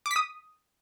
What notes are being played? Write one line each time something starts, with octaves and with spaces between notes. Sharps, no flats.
D6
B6
D#6